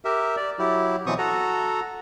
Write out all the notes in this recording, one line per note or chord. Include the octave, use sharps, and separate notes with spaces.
G4 A#4 E5
D5
F#3 E4 G4
B2 E3 F#3 C4 C#6 D#6
F#4 A4 A#5